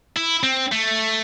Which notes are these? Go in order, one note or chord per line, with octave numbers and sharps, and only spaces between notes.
E4
C4
A3